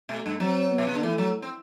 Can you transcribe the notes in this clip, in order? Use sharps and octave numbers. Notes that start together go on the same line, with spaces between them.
B2 A3
G2
F#3 C4
B3
B2
C3
D3
E3 A3
F#3
C4